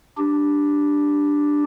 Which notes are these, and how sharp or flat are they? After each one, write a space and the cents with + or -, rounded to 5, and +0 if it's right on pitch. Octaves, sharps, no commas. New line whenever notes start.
D4 +0 G4 +0